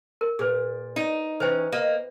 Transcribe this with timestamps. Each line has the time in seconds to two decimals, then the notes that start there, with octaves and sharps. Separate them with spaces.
0.21 A#4
0.39 A#2 G#4 B4
0.96 D#4
1.40 E3 C#4 B4 C5 G5
1.72 A#3 D#5